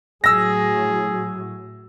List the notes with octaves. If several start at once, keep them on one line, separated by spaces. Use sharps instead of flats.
A2 F#3 G#4 E6 A#6